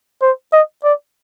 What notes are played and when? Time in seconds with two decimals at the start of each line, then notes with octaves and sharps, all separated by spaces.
0.22 C5
0.53 D#5
0.84 D5